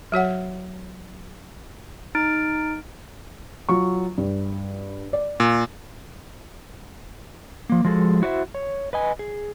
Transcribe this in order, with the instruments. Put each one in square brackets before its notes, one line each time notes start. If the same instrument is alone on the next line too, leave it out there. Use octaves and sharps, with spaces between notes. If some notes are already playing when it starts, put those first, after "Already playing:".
[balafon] F#3 F#4 C#5 F#5
[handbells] D#4 F6 A6 D7
[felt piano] F#3 F4 C#6
G2
D5
[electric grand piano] A#2
[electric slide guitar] F3 A#3
F3 G#3 F#4 G#4 A4
E4 F#4 C5 D5 E5
C#5
B4 D#5 G#5
G#4